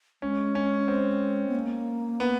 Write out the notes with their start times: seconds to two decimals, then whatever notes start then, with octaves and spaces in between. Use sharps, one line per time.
0.22 G#3 C#4
0.55 C#4
0.88 C4
1.48 B3
1.55 A#3
2.20 B3